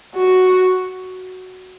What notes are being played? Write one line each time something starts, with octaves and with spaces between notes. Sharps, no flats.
F#4